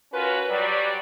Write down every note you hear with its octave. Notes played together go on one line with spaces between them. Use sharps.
C#4 F4 F#4 A#4 B4
F#3 G3 D5